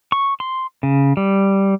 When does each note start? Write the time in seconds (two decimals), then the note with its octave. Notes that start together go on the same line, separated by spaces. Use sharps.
0.12 C#6
0.40 C6
0.83 C#3
1.17 G3